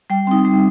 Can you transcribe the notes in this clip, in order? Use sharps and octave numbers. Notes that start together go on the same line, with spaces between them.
G3 G5
C4 D#4
G3